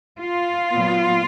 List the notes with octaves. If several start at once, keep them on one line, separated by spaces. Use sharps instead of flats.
F4
A#2 F#3 B3